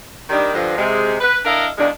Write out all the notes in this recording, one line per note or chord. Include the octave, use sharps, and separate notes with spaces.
D#3 G3 D4
G2 D3 F3
C3 G#3
B4
D4 E4 A4 A#4 D#5 F5
E2 A#2 D#3 G#3 D4